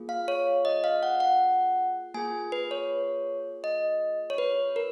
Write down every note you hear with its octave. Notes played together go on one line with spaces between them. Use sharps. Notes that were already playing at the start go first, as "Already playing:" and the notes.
Already playing: A#3 F4 G#4
F5
C#5
D#5
F5
F#5
F#5
A#3 F4 G#4 G#5
B4
C#5
D#5
C#5
B4
A#4